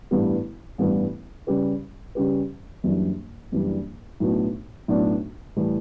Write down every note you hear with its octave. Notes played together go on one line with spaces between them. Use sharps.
A1 G2 E3 G3 B3
A1 G2 E3 G3 B3
C#3 G3 C#4 G4 B4
C#3 G3 C#4 G4 B4
F#1 F#2 E3 G3 D4
F#1 F#2 E3 G3 D4
B1 A2 F#3 B3 D4
B1 A2 F#3 B3 D4
A2 E3 G3